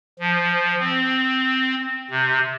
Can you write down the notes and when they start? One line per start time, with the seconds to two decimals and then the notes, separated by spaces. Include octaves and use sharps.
0.19 F3
0.80 C4
2.11 C3